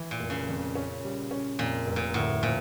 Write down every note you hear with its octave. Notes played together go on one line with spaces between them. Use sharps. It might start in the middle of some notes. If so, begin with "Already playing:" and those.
Already playing: E3
A#2
F1
C#3
F2
C#4
G3
C#4
F2 A#2
F1
A#2
D2 A2
A#2 F3